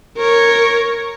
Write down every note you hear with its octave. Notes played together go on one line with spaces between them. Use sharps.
A#4 C#5